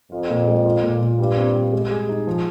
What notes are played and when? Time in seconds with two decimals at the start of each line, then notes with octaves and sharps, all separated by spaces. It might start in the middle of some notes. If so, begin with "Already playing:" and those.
0.12 F2 F4
0.30 A#2
0.47 G#3
0.66 F4
0.83 A#2
1.01 A#2
1.19 G2 G3
1.37 C4
1.56 G3
1.73 G#3
1.91 G#4
2.09 D#4
2.27 F3